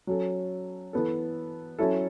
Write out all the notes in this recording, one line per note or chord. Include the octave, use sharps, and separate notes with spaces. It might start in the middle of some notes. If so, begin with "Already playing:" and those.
F#3 C#4 A4
E3 B3 A4
F#3 C#4 E4 A4